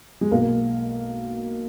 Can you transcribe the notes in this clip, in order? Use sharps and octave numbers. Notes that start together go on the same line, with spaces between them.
G#3
B1 B2 A#3